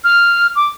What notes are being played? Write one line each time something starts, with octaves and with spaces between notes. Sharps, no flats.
F6
D6